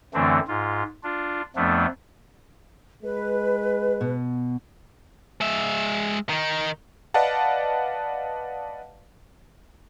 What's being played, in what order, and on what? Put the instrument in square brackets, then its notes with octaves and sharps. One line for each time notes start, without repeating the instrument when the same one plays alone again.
[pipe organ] F#2 D3 E3 A3 C4 D4
G#2 F4
D4 F4
F2 F3 A3 B3 D4
[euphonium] G#3 [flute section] B4
[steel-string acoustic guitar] B2
[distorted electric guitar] G#3 E5
D#3 D#4
[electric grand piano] B4 D5 D#5 F5 F#5 A5